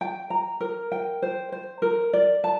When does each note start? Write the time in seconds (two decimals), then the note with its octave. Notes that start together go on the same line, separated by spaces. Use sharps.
0.01 G5
0.30 A#5
0.60 A#4
0.92 G5
1.22 C5
1.52 C5
1.82 A#4
2.13 D5
2.44 A5